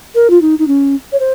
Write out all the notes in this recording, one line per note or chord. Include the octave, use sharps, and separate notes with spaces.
A#4
F4
D#4
D#4
C#4
C#5
C5